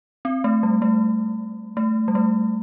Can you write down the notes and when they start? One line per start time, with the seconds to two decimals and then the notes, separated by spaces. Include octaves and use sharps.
0.25 C4
0.44 A3
0.63 G3
0.82 A3
1.77 A3
2.08 G3
2.15 A3